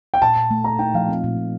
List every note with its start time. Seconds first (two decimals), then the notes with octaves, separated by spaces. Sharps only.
0.14 G5
0.22 A#2 A5
0.37 A#2
0.51 A3
0.64 A#2 A#5
0.79 D#4 G5
0.94 F3 F5
1.09 C4
1.24 A#2
1.37 A#2